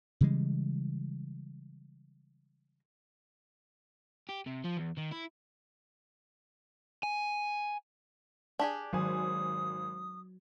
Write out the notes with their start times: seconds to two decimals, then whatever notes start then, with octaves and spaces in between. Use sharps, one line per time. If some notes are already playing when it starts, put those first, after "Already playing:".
0.21 C#3 E3 G3 G#3
4.29 G4
4.47 C3
4.65 F3
4.77 E2
4.98 D#3
5.12 E4
7.03 G#5
8.59 D4 G4 G#4
8.93 G#1 F#3 G#5 D#6